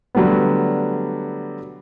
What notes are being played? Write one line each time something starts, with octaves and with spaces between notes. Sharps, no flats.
D3 F#3 G3 A3 B3